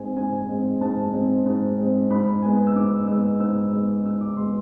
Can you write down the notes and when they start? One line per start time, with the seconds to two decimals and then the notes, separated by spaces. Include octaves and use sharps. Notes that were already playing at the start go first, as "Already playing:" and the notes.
Already playing: G#2 G#3 C4 G#5
0.16 G#2 G#5
0.48 G#3 C4
0.81 G#2 A5
1.13 G#3 C4
1.46 G#2
1.77 G#3 C4
2.10 G#2 B5
2.42 G#3 B3 G#5
2.67 E6
2.76 G#2 D6
3.07 G#3 B3 E6
3.39 G#2 E6
3.72 G#3 B3
4.04 G#2 E6
4.21 D6
4.37 G#3 B3 C6